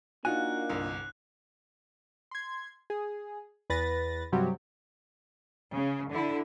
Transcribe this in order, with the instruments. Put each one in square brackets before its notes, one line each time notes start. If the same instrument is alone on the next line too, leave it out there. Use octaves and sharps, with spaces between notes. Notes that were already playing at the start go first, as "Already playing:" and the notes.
[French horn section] A#3 D4 [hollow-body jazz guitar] D#4 F4 G#5 [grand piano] F#4 [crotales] F#6
[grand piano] G1 C2
[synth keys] C6 G#6
G#4
E2 B4 A6 A#6
G2 C3 F#3 G3 C4 G4
[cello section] C#3
D3 E4